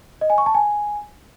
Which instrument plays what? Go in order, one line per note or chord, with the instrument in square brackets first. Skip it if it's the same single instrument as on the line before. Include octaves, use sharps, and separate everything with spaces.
[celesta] D#5
G#5
C#6
A5
G#5